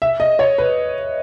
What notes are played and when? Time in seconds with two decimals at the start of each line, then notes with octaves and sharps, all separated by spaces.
0.02 E5
0.20 D#5
0.39 C#5
0.58 B4